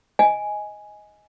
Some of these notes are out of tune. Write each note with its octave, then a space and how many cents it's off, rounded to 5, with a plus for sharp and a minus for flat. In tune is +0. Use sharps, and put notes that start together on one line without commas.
D#5 +10 G#5 +0